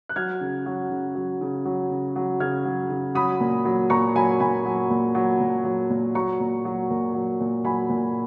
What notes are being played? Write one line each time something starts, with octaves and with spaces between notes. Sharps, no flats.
F#6
F#3 F6 G#6
C#3
F#3
C#3
F#3
C#3
F#3
C#3
F#3
C#3 F6 G#6
F#3
C#3
F#3 B5 D#6
A#2
F#3
A#2 A#5 C#6
F#3 G#5 B5
A#2 G#5 B5
F#3
A#2
F#3
A#2
F#3
A#2
F#3 A#5 C#6
A#2
F#3
A#2
F#3
A#2
F#3 G#5 B5
A#2